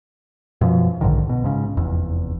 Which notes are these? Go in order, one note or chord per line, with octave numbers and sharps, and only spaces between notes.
F#2 B2 F3
B1 G#2 D3 D#3
B2
G#2 C#3
F1 E2